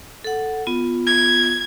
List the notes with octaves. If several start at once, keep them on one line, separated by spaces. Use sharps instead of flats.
A4 F#5
B3 F4
G#6